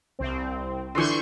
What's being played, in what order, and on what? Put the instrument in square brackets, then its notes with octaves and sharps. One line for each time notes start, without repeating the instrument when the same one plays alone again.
[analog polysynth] C2 C4
[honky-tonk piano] D3 E3 [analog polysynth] C6 C#6 G6